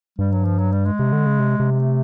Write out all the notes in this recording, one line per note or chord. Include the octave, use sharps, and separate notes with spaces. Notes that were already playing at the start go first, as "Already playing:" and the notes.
G2 G3
F#3
F3
F#3
G3
G#3
C3
D3
C#3
C3
C3
G#3
A3